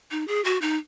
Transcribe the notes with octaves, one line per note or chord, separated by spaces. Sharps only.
D#4
G#4
F#4
D#4